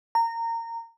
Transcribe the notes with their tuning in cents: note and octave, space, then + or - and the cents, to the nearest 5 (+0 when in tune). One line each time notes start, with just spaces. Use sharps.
A#5 -20